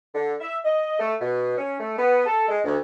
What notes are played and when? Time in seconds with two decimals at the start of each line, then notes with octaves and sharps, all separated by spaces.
0.13 D3
0.40 E5
0.63 D#5
0.99 A3
1.20 B2
1.58 C#4
1.78 A3
1.97 B3
2.26 A4
2.48 G#3
2.64 D2